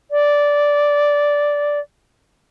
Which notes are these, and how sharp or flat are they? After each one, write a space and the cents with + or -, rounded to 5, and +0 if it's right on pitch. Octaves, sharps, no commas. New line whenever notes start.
D5 -10